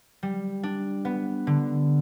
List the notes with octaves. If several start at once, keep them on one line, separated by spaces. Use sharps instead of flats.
G3
D4
B3
D3